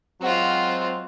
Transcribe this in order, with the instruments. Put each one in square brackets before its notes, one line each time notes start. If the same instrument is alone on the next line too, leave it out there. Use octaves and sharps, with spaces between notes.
[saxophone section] F#3 G#3 C4 [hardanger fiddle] F4 F#4